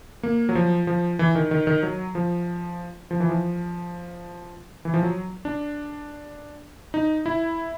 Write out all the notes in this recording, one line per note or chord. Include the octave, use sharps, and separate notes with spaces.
A#3
F#3
F3
F3
E3
D#3
D#3
D#3
F#3
F3
F3
E3
F3
E3
F3
F#3
D4
D#4
E4